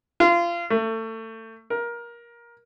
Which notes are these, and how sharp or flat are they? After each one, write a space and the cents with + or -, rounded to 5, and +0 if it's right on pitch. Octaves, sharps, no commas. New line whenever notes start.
F4 -25
A3 +30
A#4 +20